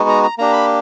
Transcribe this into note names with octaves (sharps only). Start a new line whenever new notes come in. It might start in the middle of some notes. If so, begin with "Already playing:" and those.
Already playing: G#3 B3 D#4 F#4
A#5
A#5
A#3 D4 G4 A#5
B5